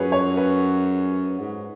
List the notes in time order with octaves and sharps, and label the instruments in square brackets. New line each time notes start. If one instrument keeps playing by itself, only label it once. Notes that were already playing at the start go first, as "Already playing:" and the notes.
Already playing: [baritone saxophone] F#2 [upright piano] F#4 G#4 B4 C#5
[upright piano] C#5
B4
[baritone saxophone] G#2